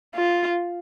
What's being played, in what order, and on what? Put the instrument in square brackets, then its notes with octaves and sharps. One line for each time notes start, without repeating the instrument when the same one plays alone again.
[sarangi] F4